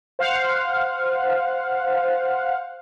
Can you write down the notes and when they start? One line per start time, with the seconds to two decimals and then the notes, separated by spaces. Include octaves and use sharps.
0.19 C5 F5 F#5